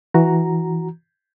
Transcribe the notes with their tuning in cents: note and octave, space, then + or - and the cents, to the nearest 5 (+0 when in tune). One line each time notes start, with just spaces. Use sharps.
E3 +0 F#4 +0 A#5 +0